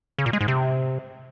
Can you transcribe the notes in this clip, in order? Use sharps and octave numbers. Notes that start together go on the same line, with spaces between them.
C#3
A#2
G#3
G#2
C3